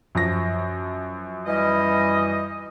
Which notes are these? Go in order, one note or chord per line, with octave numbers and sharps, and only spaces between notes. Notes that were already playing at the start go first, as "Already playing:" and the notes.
F#2 F3 A#6
E3 G3 D#5